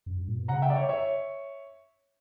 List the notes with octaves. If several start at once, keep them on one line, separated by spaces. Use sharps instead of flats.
F#2
G2
A#2
B2
C#3 F#5 A#5
E5 G5
D5
C#5 E5
C#5 E5